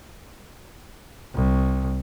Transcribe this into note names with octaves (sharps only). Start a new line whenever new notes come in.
C2